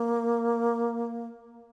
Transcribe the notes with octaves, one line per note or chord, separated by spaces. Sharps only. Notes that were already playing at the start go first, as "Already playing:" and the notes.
Already playing: A#3